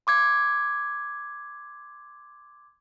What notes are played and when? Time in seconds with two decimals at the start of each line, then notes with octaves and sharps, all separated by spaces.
0.07 C6 D6 G#6